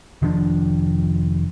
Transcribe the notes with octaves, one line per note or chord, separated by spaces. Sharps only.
F1 D#3 F3 D4